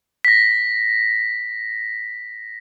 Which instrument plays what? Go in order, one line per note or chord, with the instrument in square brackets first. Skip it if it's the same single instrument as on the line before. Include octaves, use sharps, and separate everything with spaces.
[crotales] A#6 B6